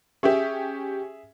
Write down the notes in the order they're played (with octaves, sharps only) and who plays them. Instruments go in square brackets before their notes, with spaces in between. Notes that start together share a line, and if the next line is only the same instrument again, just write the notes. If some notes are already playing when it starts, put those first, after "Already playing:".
[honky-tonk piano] C#4 G4 [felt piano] G#4 E5